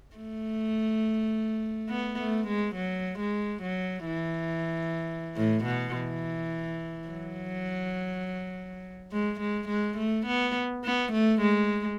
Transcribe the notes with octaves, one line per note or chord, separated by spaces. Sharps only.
A3
B3
A3
G#3
F#3
G#3
F#3
E3
A2
B2
E3
F#3
G#3
G#3
G#3
A3
B3
B3
A3
G#3